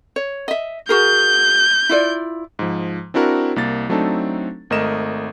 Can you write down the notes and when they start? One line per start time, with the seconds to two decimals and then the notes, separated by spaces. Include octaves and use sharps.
0.16 C#5
0.48 D#5 E5
0.89 F#4 G#4 A#4 G6
1.89 E4 F4 D5
2.59 G#2 F3
3.14 C4 D4 E4 F#4 A#4
3.56 C2 A#3 A6
3.89 F#3 A3 C4 D4 D#4 A4
4.70 G#1 A3 A#4 D#5 E7